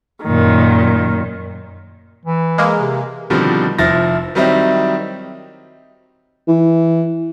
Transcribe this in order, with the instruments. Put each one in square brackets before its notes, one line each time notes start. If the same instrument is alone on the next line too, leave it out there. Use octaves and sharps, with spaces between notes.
[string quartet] F#2 A#2 D#3
[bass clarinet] E3
[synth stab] G#3 A#3
[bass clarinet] C3
[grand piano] B2 D3 D#3 F3 G3 C4
F1 F3 E4 A6 A#6
D#3 F#3 G3 C4 D#4 E4
[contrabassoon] E3